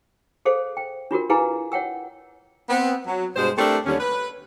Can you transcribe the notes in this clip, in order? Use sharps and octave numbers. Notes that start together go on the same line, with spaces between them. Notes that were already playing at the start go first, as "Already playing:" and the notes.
G#4 A4 C5 F5
G5
D4 F4 F#4 A#4
E4 G#4 B4 F5 G#5 A#5
C#5 F#5 G5 E6
B3 C4
F#3
G2 B2 G#3 C5
A3 C4 D4 E4 G4 A#4
D#2 D3 G3 C#4
B4